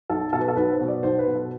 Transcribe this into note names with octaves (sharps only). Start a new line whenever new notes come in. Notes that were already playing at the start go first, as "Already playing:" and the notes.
B1 A4
B2 A4
B4
A4
B1 B4
C5
B2
D5
B1 C5
B4
B2
A4